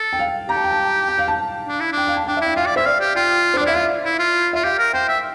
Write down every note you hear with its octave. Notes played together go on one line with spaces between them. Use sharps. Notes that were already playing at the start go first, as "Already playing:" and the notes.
Already playing: A4
G5
F5
G4 A#5
A5
G5
A5
G5
F5
A5
D4
E4
D4
G5
F5
A5
D4 G5
E5
E4
G5
F4 F5
D5
C5 E5
D5 F5
G4
F4 G5
C5
D4 D5
E4 E5
F4 F5
E4
F4
F4 E5
G4 F5
A#4
C5 G5
E5